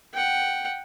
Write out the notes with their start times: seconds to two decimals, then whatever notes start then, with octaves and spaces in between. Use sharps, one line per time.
0.14 F#5 G5